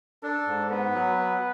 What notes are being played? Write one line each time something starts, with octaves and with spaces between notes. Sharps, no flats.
D4 A4
G#2
B3 B4
F#3
B3